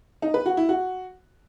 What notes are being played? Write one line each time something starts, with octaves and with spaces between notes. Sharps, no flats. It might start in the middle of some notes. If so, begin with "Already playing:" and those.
D#4
B4
F#4
E4
F#4